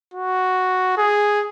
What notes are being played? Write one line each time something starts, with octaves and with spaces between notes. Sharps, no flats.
F#4
G#4